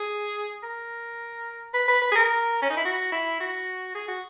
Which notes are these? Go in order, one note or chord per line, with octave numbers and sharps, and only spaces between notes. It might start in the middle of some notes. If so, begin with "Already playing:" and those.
Already playing: G#4
A#4
B4
B4
B4
G#4
A#4
C#4
D#4
E4
F#4
E4
F#4
G#4
F#4